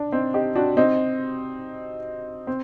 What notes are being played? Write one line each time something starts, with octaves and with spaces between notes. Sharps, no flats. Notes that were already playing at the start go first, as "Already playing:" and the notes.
Already playing: D4
C4 D#4
D#4 G4
D4 F#4
C4 D#4
C4